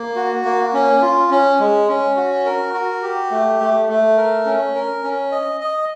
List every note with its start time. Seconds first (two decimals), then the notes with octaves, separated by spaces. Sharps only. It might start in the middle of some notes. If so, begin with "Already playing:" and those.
Already playing: A#3
0.16 F#4
0.45 A#3
0.73 C#4
1.02 F4
1.31 C#4
1.60 G#3
1.88 C#4
2.17 F#4
2.45 A#4
2.74 F#4
3.03 G4
3.31 A3
3.60 A3
3.89 A3
4.17 A#4
4.46 C#4
4.75 A#4
5.03 C#4
5.32 D#5
5.61 D#5